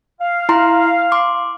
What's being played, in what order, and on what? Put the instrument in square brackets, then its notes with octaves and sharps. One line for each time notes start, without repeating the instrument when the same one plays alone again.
[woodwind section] F5
[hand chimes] E4 A#5 C6
C6 D6